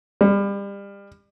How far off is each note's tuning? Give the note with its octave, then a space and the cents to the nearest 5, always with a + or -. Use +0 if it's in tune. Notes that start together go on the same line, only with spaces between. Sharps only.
G3 +30